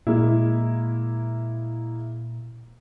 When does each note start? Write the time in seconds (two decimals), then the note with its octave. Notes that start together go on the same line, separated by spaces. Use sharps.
0.07 A#2 G#3 A#3 E4